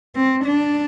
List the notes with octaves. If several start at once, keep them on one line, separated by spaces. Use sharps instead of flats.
C4
D4